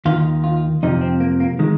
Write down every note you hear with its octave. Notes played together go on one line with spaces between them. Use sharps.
D#2 D#3 F4
F4
F2 C3 F3 D#4
C4
A#3
A#3
D#3 G#3